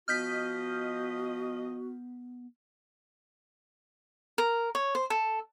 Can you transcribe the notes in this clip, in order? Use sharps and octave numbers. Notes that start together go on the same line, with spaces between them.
F3 B3 F#4 D#5 F6 G6 B6
A#4
C#5
C5
A4